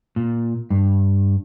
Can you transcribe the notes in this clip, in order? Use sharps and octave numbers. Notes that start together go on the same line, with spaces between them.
A#2
G2